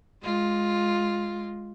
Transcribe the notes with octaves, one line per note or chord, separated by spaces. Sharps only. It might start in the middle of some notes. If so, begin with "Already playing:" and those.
G#3 F4